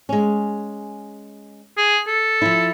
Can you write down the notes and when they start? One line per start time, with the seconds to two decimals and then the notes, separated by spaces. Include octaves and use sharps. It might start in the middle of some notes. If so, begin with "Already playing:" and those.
0.09 G#3 C#4
1.77 G#4
2.07 A4
2.42 F3 E4